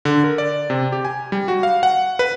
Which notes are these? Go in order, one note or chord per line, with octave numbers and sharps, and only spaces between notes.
D3
A#4
D5
C3
G4
G#5
G3
F#4
F5
F#5
B4